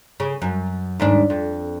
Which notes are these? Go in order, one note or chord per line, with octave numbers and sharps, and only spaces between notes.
C#3
F#2
D#2 G#2 D4
F2